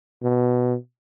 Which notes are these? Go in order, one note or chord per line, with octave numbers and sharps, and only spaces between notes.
B2